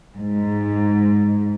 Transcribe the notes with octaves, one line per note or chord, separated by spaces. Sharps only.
G#2